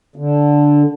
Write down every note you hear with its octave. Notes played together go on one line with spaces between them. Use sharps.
D3